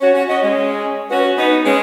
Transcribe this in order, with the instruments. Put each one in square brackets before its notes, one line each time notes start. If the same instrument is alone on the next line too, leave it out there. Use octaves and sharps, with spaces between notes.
[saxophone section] C#4 F#4 [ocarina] C#5
[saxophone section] C#4 F#4
[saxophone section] C#4 F#4 [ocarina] D#5
[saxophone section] G#3 C#4
[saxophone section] C#4 F#4 [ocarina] B4
[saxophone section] B3 D#4 [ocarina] B4
[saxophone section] G#3 C#4